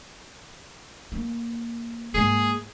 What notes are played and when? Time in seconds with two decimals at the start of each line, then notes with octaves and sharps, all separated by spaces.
1.12 A#3
2.14 G#2 A#3 G#4